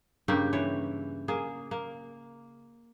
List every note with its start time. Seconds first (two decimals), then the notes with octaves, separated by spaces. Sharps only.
0.28 G2 C#3 A#3 G4
0.53 E3 C#5
1.28 A#3 G#4
1.71 A#3